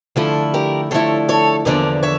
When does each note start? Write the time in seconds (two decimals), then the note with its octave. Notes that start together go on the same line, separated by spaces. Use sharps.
0.16 D3 F3 A3 E4 F4 A4
0.54 G4 A#4
0.91 D3 F3 A3 E4 A4 C#5
1.29 A4 C#5
1.65 E2 D3 F3 A#3 D4 A#4 D5
2.03 C#5 E5